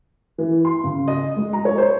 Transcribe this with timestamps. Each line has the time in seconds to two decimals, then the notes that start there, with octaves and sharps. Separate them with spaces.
0.38 E3
0.65 C6
0.84 C#3
1.08 D#5
1.36 G#3
1.53 A#5
1.65 C#5
1.78 C5